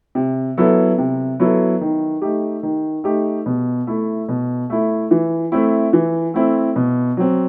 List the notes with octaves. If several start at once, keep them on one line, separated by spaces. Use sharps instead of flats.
C3
F#3 B3 E4 A4
C3
F#3 B3 E4 A4
D#3
A3 D#4 G4
D#3
A3 D#4 G4
B2
A3 E4
B2
A3 E4
E3
A3 C4 E4
E3
A3 C4 E4
B2
F#3 C4